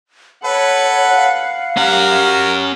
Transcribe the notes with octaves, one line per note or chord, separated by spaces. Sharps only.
A4 B4 C#5 F#5
F5
C#4 G4 A#4 F#5